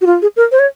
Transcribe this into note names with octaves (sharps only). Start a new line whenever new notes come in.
F#4
F4
G#4
A#4
C5
C#5